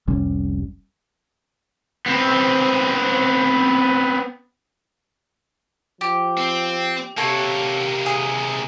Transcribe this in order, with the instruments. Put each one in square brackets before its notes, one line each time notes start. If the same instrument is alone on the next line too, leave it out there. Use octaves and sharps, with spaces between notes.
[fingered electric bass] F1 C2 G3 C#4
[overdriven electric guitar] B3 C4
[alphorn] F3 [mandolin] G4
[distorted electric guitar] C4
[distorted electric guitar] C3 A#3 [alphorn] G4 [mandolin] A4 C#5 F#5
[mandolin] G#4